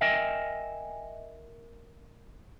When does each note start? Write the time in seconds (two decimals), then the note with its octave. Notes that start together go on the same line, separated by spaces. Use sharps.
0.01 A#4 D#5 E5 G5 G#5